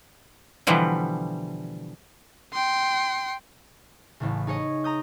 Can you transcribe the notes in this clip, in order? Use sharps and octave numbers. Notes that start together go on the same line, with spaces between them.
B2 D3 E3 F3 G3
G5 C6
A1 A2 C#3
D#4 G#4 C#5 D#5
A#5 D#6 G6